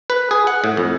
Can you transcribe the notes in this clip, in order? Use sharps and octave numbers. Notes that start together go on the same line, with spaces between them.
B4
G#4
F#5
A2
F2